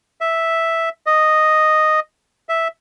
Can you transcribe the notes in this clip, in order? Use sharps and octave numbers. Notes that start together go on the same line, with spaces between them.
E5
D#5
E5